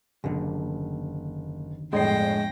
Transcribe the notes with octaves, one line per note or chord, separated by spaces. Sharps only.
F#1 D#2 D3
G1 F2 A2 G#3 G5 A#6 C7